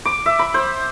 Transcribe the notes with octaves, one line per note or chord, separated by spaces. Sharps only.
D6
E5
B5
C5